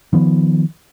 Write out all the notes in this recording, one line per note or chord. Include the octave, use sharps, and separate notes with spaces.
D#3 F3 B3